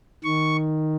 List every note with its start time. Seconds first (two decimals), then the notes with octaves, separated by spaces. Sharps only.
0.24 D#3 C#6